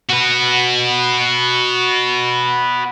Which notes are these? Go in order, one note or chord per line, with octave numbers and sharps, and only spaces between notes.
F#4 B4